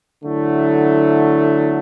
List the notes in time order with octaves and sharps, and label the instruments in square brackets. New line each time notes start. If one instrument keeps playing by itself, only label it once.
[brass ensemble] D3 F#3 A3 E4